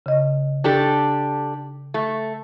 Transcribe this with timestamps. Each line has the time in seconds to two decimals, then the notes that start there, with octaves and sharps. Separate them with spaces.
0.06 C#3 D#5
0.64 D4 G4 A4
1.94 A3